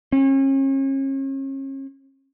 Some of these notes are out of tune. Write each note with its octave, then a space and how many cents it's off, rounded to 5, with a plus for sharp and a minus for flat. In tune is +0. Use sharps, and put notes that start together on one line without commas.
C#4 -40